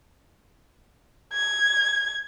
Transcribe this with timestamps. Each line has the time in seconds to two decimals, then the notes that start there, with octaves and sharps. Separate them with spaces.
1.33 G#6